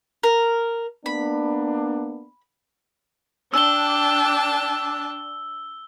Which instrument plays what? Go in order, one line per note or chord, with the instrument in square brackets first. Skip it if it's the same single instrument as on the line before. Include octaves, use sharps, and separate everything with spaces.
[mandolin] A#4
[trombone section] A#3 B3 D4 [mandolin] B5
[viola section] D4 [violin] G5 A5 [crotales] E6 G7